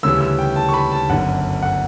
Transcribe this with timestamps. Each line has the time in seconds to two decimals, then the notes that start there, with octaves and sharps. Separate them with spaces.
0.03 D2 C#3 E3 G3 C#4 E6
0.21 E6
0.39 G5
0.56 A5
0.69 C#6
0.74 B5
0.92 A5
1.09 G1 F#2 D3 F#5
1.62 F#5